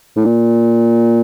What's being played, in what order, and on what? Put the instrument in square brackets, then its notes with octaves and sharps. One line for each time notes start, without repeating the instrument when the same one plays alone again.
[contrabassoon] A2
A#2